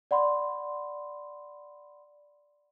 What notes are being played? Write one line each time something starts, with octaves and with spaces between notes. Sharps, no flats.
D5 F#5 B5 C6